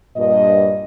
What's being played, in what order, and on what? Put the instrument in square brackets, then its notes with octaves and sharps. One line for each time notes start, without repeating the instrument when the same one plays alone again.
[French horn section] G2 A#2 D#5